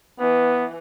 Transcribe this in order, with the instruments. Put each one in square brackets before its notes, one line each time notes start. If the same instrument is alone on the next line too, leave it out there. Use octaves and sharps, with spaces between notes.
[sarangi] E3 [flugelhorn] B3